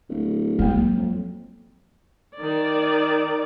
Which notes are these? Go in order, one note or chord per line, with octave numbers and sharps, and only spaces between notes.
D1
F#3 G#3 A#3
F2
D#3 D5